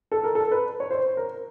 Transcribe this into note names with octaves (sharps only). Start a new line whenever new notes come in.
A4
A#4
A4
B4
C#5
C5
A#4